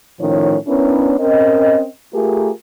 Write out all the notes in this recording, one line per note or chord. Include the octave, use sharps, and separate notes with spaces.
A2 D#3 F3 C#4 C#5
B3 C#4 D4 E4 A#4 C#5
C4 C#4 A#4 D#5
A3 F4 G4 G#4 A#4